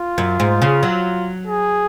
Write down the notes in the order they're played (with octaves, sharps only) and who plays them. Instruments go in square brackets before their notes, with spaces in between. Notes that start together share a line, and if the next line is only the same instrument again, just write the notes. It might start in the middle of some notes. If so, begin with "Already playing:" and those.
Already playing: [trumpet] F4
[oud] F#2
G#2
C#3
F#3
[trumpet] G#4